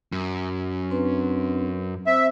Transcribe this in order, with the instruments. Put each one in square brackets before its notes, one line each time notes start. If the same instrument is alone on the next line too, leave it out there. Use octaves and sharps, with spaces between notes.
[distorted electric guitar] F#2
[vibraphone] C4 D4 B4
[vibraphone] C4 C5 [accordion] E5